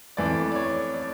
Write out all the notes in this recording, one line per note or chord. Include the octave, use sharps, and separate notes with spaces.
F2 E3 A3 D5
D5
C#5
D5